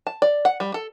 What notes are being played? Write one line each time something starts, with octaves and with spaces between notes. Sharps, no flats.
A5
D5
F#5
G3
A4